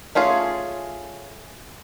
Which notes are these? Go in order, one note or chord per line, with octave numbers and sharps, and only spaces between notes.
A3 C#4 F4 G#4